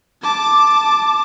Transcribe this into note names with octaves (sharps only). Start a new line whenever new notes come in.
A5 D6